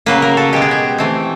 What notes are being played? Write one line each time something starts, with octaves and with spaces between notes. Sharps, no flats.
C#3 F#3 A#3 B4
A#4
A4
B2 G#3 B3 G4
G#4
G4
E3 A3 C4